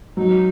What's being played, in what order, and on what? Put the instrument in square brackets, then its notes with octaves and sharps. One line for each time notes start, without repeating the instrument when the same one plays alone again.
[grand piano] F#3 [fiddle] D#4